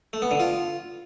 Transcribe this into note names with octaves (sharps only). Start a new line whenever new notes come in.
A3
B3
D3
F4